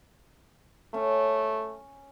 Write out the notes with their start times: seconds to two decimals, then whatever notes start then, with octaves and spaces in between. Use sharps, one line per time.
0.94 A3 C#4